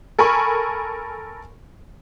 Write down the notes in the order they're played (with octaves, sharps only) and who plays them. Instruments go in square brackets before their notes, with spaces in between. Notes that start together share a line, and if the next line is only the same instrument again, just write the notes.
[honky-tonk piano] A4 A#4 G#5 B5 C#6